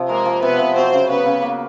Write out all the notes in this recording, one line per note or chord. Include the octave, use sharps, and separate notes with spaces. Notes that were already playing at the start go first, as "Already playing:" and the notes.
Already playing: C3 F3
G#3 A#3 A#4
F3
C3 B3 B4
C3
F#3 C4 C5
C#3
C#3 B3 B4
C#3
A#3